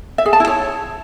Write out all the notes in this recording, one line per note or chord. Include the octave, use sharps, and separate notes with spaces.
E5
G#4
A5
E4
C#5